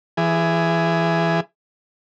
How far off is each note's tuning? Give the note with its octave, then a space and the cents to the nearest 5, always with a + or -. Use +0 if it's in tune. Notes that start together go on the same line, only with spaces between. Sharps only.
E3 +20 G#4 +0